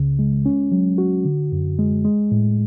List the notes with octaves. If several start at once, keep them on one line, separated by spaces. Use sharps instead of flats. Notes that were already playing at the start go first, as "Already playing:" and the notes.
Already playing: C#2 C#3
G#3
C#4
F#3
F#4
D3
F#2
G#3
G#3
A2